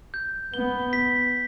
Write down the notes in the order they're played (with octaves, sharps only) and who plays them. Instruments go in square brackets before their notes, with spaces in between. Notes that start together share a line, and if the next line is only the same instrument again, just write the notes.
[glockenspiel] G6
[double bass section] B3 [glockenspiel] G7
[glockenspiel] B6